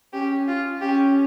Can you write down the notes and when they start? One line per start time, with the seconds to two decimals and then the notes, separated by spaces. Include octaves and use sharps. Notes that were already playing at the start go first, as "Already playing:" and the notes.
0.13 C#4 G4
0.48 F4
0.82 C#4 G4